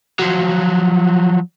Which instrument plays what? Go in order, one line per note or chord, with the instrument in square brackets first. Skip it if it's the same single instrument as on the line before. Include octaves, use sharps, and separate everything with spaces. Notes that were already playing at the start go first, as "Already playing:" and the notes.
[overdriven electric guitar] F3 F#3